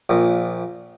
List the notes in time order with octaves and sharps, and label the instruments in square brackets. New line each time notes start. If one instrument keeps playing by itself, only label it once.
[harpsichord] A#1 A#2